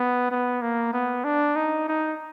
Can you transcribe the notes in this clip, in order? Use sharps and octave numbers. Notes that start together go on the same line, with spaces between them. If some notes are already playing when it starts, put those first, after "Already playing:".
Already playing: B3
B3
A#3
B3
D4
D#4
D#4